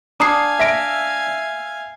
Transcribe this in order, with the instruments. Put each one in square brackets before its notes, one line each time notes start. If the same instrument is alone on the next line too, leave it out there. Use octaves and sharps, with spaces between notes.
[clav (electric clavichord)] D4 [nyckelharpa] F5 G#5 [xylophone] A#5 D#6 C7
[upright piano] E5 A#6 D7